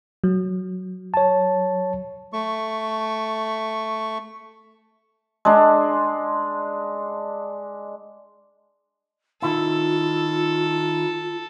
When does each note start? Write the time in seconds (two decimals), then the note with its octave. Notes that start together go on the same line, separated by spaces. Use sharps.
0.24 F#3
1.14 C#5 A5
2.33 A3 C#6
5.45 G#3 D4
9.42 D#3 E4 F4 A4